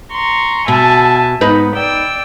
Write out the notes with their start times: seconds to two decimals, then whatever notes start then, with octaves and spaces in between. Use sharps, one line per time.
0.13 A#5 C6 C#6
0.68 B2 E5 G#5 A5
1.41 G#2 B3 D#4 B4
1.75 D5 G5 E6